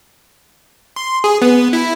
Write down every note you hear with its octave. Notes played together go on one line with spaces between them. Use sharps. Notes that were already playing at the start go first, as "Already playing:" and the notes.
C6
G#4
B3
E4